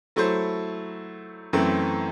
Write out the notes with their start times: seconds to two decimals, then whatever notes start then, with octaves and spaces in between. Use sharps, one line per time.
0.16 F#3 A3 E4 A4 C5
1.53 F#2 E3 A3 C4